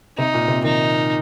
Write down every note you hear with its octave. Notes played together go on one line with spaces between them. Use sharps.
C3 D#4
A#2
C3
D#3 D#4